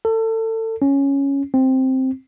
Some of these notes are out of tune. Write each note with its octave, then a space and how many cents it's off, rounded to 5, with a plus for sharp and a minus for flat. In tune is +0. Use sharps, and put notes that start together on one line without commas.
A4 +30
C#4 +0
C4 +5